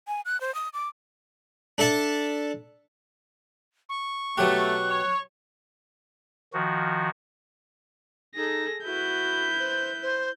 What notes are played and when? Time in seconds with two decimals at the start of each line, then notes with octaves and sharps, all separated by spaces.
0.08 G#5
0.25 F#6
0.41 C5
0.55 D#6
0.74 D6
1.78 D4 A4 E5 A5
3.89 C#6
4.38 B2 F#3 A3 G4 F#6
4.89 C#5
6.53 D#3 F3 F#4
8.36 D#4 G#4 A4 A#6
8.84 E4 F#4 B4 G6
9.59 C5
10.02 C5